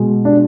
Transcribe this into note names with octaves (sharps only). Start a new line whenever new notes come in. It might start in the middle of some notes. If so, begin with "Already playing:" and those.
Already playing: B2 G#3
D4